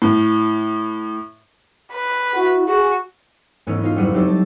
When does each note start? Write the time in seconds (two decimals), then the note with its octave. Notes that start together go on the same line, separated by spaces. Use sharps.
0.02 A2
1.93 B4
2.34 E4 F#4
2.68 F#4 G#4
3.67 E1 G#2 A3 B3 C#4 D#4
3.82 B3 D#4 F4
3.96 F#1 F2 G3 F#4 F#5 D#7
4.14 F#3 C4 D#4 E4 G4 A4
4.29 A5